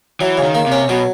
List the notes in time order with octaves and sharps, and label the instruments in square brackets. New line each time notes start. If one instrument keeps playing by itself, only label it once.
[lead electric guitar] E3 [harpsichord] F#3
[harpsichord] C#3
[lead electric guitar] D#3
[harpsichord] A#3
[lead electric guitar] C3
[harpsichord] C#4
[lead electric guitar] B2 [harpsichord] F#3